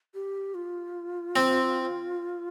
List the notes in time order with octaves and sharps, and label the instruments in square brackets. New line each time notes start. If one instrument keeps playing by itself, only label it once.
[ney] G4
F4
[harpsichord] C4